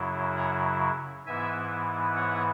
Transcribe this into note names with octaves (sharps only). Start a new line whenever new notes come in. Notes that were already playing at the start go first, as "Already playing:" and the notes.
Already playing: F#2 C#3 F#3 E4
C#5 F#5
G#2 E3 B3 E4 E5 G#5
C#5 F#5